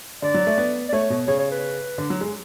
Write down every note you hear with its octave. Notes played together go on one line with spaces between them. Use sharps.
D3 D5
F#3
A3
B3
D5
A3 C#5
B2
C#3 C#5
C#5
B4
D3
F#3
G#3